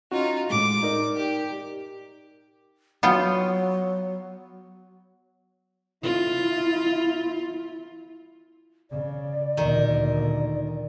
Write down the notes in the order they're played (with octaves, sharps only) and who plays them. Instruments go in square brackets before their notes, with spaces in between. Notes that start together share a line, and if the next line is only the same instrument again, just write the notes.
[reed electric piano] C#4 F#4 [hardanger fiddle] D#4 F4
[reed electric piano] A2 G#3 [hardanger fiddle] D6
[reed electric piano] D#4 A#4 D5
[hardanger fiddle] G4
[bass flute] F#3 [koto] B3 F4 G5
[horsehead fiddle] E4 [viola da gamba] F4
[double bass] C#3 [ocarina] D5
[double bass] D2 A#2 [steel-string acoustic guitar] D#3 A#4